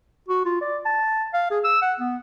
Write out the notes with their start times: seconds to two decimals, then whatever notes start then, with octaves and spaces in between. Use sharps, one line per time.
0.29 F#4
0.45 F4
0.61 D5
0.85 A5
1.34 F5
1.51 G#4
1.64 E6
1.82 F#5
2.00 B3